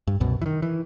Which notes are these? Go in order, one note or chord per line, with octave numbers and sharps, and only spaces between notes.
G2
C2 F#2 B2
D#3 E3
E3